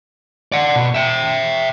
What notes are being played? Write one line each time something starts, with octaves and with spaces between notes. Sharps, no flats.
D5 F#5
B2
E5 G5